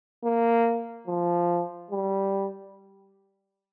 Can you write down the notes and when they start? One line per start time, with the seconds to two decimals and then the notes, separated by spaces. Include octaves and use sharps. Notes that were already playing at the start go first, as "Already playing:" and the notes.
0.24 A#3
1.07 F3
1.91 G3